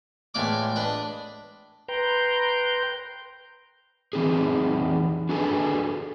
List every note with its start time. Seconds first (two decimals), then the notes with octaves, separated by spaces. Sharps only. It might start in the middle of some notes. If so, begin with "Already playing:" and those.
0.34 A2 E3 G#3 F4 D5 D6
0.76 D4 B4 D#5
1.88 B4 G5 A#5 C6 G6
4.13 E3 C4 D#4 G#4
5.29 D4 F#4 G#4 A4 B4 G#5